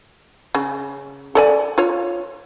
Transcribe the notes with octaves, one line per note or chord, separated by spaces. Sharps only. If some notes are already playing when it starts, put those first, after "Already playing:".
C#3
A4 D5 G#5
F4 C#5